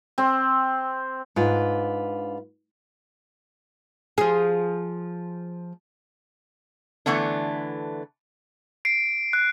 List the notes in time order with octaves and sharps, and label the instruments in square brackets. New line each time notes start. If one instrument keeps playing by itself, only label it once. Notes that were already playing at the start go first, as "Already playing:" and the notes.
[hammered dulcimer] C4
[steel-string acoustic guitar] G#2 D4 F4 B4
[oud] F3 G#4
[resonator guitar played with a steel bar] D3 E3 A3 B3 D4
[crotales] C7 D7
F#6